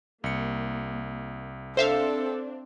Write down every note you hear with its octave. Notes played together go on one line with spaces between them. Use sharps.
C2 A#3 C#7
C4 D4 A4 C5 E5 F5